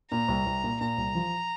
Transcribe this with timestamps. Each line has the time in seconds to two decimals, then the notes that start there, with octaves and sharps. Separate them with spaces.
0.11 A#2 A#5
0.28 C2
0.46 C2
0.64 A#2
0.81 A#2 A#5
0.98 C2
1.15 F3